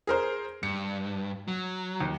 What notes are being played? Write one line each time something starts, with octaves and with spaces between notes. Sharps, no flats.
G#4 A#4 C5
G2 C#7
F#3
D#2